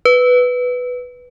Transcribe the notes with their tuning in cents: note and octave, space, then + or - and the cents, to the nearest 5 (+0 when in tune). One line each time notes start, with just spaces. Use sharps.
B4 +5